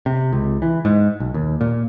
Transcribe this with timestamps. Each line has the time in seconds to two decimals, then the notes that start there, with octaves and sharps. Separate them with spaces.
0.06 C3
0.32 C#2
0.62 E3
0.85 G#2
1.20 B1
1.34 D#2
1.61 A#2